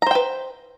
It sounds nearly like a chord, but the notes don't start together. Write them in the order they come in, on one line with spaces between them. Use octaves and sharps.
A#5 C5 G5 B4